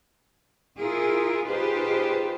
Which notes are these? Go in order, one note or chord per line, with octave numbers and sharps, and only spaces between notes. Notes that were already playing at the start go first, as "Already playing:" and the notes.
E4 F4 G#4 A#4
D#4 F4 G4 G#4 B4 C5